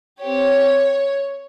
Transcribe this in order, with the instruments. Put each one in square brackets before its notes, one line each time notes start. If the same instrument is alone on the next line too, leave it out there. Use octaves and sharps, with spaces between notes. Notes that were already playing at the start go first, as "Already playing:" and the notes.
[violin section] C4 G4 C#5